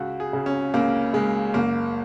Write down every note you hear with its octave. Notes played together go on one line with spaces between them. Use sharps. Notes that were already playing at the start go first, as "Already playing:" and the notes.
Already playing: C#2 F#4
G#4
C#3
C#4
C#2 A#3
C#3 G#3
F#1 A#3